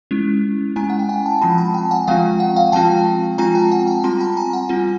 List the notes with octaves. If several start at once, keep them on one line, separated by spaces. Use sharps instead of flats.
G#3 C#4 E4
G#3 C#4 E4 G#5 A#5
F#5
G5
F#5 G#5
G5 A5
F3 G#3 C4 F4 A5 B5
A5 B5
G5 A5
F#5 G#5
F3 G#3 C4 F4 F5 G5
F#5
F5 G5
F3 G#3 C4 F4 G5 A5
F3 G#3 C4 F4 G#5 A#5
G5 A5
F#5 G#5
G5 A5
G3 C4 F4 A#5 C6
A5 B5
G#5 A#5
F#5 G#5
G3 C4 F4